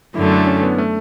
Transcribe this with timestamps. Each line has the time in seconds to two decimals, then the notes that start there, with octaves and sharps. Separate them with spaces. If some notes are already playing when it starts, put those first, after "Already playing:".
0.15 F#2 D3 A3 E4
0.31 D4
0.47 C#4
0.63 B3
0.78 A3